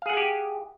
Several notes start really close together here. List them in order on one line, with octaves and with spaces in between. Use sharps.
F5 G#4 F#5 G#5 G4